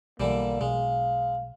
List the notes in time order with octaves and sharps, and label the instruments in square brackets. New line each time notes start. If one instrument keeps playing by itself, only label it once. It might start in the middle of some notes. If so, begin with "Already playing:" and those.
[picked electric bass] B1 [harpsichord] D3 E3 G3 [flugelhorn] A#3
[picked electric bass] B1 [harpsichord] G#3 [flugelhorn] F5